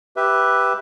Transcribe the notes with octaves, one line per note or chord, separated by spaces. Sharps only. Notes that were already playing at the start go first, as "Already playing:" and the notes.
G4 B4 E5